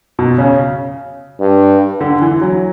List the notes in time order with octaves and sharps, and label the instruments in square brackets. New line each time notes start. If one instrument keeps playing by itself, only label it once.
[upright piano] B2
C#3
[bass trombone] G2
[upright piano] D3
E3
F#3